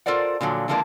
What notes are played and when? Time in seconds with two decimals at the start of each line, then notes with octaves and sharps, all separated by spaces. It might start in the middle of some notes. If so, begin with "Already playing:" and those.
0.06 F4 A4 A#4 C5 D5 F#5
0.41 A#2 D3 F3 F#3
0.68 D3 E3 F3 G#3 A#3 D4